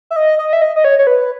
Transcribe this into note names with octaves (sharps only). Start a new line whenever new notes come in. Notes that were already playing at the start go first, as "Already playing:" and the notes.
E5
D#5
D#5
E5
D#5
D#5
C#5
C#5
B4